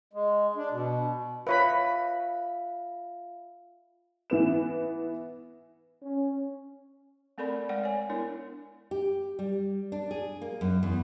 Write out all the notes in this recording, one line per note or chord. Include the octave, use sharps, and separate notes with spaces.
G#3
D4
B2
F4 B4 C#5 E5 F5 B5
E3 B3 E7
C#4
A3 C4 A4 A#4 D5 B5
G#3 D5 F#5 G5
C#5 G#5
B3 D4 E4 A#4 C#5
G4
G3
D4
G#4
A#3
F#2
E2